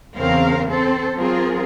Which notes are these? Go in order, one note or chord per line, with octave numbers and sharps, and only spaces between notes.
E2 C#3 C4 A#4 F5
C4 A4 C5
F#3 C4 F4 G#4 A#4